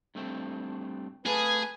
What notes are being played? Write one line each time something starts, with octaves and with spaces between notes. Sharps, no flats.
G2 A3 C4
A3 G#4 B4 F5 G#5 A5